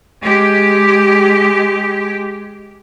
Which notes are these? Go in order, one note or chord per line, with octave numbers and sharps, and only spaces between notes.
G#3 G4